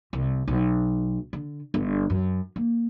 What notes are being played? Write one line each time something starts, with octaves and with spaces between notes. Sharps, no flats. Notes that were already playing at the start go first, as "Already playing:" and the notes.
C2
B1
D3
G1
F#2
A#3